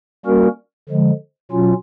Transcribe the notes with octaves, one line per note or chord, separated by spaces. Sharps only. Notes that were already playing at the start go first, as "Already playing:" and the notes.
G3 A#3 C#4 F#4 A#4
D3 F3 G#3
B2 F#3 C#4 F4